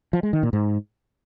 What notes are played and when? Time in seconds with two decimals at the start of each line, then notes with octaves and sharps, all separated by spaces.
0.13 F3
0.23 G#3
0.33 D#3
0.43 A#2
0.53 G#2